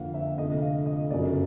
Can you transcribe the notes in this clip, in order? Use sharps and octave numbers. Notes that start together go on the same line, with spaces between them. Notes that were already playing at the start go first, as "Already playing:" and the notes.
Already playing: F2 D3 F3 A#3 F5 F#5
E5
F1 F2 D3 D#5
F5
D#5
G1 F#2 C#3 F#3 D5